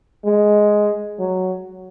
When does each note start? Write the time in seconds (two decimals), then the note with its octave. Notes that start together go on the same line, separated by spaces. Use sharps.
0.25 G#3
1.19 F#3